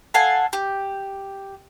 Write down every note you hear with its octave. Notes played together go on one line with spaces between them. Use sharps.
A4 F5 F#5 G#5
G4